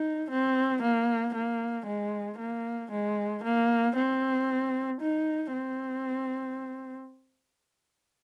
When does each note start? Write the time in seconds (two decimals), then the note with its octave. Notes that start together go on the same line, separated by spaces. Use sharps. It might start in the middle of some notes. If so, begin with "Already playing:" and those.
Already playing: D#4
0.30 C4
0.83 A#3
1.35 A#3
1.87 G#3
2.39 A#3
2.91 G#3
3.44 A#3
3.96 C4
5.01 D#4
5.53 C4